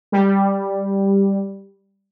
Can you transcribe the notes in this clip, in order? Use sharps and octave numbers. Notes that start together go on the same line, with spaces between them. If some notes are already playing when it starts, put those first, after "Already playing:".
G3